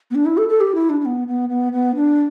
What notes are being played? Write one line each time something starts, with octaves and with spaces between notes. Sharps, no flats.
B3
D4
E4
A4
A4
G4
E4
D4
D4
B3
B3
B3
B3
D4